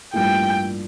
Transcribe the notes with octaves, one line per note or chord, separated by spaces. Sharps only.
A1 G2 F3 A#3 E4 G5